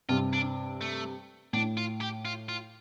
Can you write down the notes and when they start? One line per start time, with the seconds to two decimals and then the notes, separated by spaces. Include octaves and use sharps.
0.09 G2 C3 F4
0.33 D4
0.81 A3
1.53 A2 D4
1.77 F4
2.01 G4
2.25 F4
2.49 F4